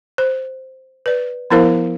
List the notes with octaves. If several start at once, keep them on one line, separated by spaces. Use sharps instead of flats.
C5
B4 D5
F3 B3 E4 A#4 C5 F5